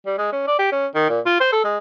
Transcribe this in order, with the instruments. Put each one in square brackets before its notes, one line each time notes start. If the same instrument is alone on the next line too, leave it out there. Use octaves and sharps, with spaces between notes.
[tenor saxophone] G3
G#3
C#4
D5
G4
C#4
D#3
A#2
F4
C5
A4
G#3